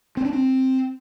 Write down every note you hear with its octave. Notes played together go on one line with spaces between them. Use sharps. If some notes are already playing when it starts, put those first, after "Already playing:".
C4
D4
C4